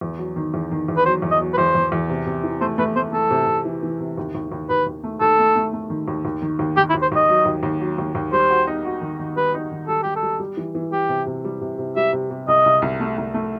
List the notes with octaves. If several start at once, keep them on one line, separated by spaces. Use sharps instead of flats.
E2
F#3
D#3
E2
D#3
E2
B4
F#3 C5
E2
D#5
F#3
B4
E2 C5
E2
E2
C3
C3
E3
A3 C5
A3 B4
A3 C5
A3 A4
C3
C3
E3
E3
C3
D#2
D#2
D#2
D#2 B4
D#2
A3
D#2 A4
A3
A3
A3
D#3
D#2
D#2
D#3
D#2
D#3 G4
E4
D#2
C5
D#2 D#5
F#3
D#2
D#2
F#3
D#2
D#2
G3 C5
F#4
D#4
F#4
D#3
D#3
G3 B4
D#4
D#3
G3 A4
G3 G4
A4
G3
G3
E3
E3
G3 G4
C3
C3
G3
C3
C3
G3 E5
C3
C3
C2 D#5
C2
C2
A3
C2
A3